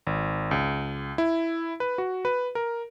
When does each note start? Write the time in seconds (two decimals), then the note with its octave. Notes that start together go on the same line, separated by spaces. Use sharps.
0.07 G#1
0.51 C#2
1.18 E4
1.80 B4
1.98 F#4
2.25 B4
2.55 A#4